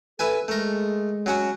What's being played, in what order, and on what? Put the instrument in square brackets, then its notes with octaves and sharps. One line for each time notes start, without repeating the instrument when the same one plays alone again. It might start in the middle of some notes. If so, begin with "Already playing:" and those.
[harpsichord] E4 B4 G#5 [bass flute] A4
[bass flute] G#3 [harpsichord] A3 A#4
[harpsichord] F#3 C#4 F#4